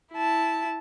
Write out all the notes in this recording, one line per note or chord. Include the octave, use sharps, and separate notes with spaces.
E4 A5